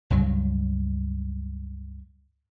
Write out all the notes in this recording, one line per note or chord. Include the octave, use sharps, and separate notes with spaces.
C#2 G2 F#3